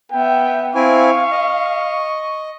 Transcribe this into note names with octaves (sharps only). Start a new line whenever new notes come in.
B3 E5 G5
C4 E4 F5 G#5 C#6
D#5